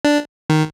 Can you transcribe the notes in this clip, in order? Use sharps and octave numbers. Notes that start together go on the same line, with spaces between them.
D4
D#3